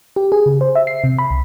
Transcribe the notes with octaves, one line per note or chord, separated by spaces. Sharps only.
G4
G#4
C#3
C5
E5
C7
C3
B5
C2